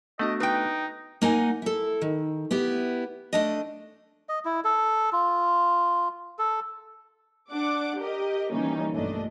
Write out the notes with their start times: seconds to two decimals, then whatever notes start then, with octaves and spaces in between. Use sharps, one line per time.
0.19 A3 B3 D4 F#4 D#5
0.40 D#4 B4 G5
1.22 A#3 D#4 F#5 G#5
1.62 E4 A4
2.01 D#3
2.51 B3 E4 G4
3.33 A3 D4 D#5
4.29 D#5
4.45 E4
4.64 A4
5.12 F4
6.39 A4
7.52 D4 F#5 D6
7.99 G4 A#4 D#5
8.52 D#3 E3 G3 A#3 C#4 D#4
8.93 B1 G2 A#2 A3 D4 D#5